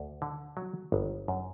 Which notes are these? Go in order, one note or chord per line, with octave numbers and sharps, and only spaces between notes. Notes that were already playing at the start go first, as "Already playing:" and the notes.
Already playing: D2
D3
F#3
G1
F#2